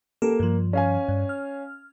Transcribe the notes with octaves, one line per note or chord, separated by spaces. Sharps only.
A#3 G4 A4
G2 F3
C#4 F5 G#5
G2
F6